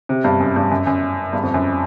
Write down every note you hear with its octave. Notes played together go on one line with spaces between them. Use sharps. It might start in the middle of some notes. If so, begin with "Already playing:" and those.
C3
G2
F#2
G2
F#2
F#2
G2
F2
F#2